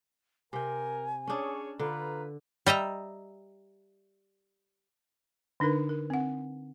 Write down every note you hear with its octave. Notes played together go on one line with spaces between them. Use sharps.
C3 A#4 G5 G#5
C#4 D4 G#4 C#5
D3 F4 B4 A#5
G3 D#5 E5 A#5
D3 D4 D#4 A#4 B4
A#4
C4 F#5